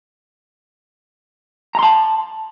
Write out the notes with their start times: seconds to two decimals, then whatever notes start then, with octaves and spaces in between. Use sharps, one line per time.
1.75 A#5
1.79 C6
1.83 A5